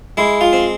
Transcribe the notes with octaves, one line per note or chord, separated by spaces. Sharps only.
G#3 E4
F4
C4